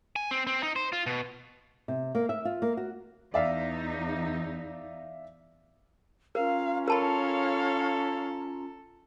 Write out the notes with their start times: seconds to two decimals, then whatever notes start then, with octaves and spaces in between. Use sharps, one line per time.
0.16 G#5
0.31 C4
0.47 C4
0.63 D#4
0.76 C5
0.93 F4
1.06 B2
1.88 C3
2.15 A#3
2.29 E5
2.45 F4
2.62 A#3
2.77 F#4
3.34 E2 D#4 D5 E5 F5
6.35 C#4 F4 A#4 F5 A#5
6.88 A4 A#4 C#5 F5 A5 B5